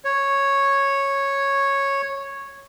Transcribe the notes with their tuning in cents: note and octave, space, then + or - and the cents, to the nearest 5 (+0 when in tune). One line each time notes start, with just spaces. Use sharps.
C#5 -5